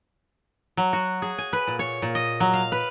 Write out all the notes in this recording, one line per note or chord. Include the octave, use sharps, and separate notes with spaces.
F#3
F#4
G#4
G#5
B4
A#2
C#5
A#2
D#5
F#3
F5
B4